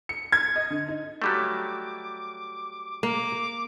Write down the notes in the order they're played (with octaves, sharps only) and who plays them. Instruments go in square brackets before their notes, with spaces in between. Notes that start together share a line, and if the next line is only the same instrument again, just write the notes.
[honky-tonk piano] C#7
G#6
D#5
D3
D#4
[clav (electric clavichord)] F#3 G3 A3 [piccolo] D6
[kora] A#3 [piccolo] D6